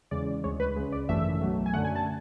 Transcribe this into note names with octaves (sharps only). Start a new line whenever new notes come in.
E2 C#3 G#3 D5
D2 C#3 G#3 C#5
B4
C#2 C#3 G#3
D5
G#1 F#2 E3 A3 E5
B1 B2 F#3 A3
G#5
F#2 D3 A3 F#5
G#5
A5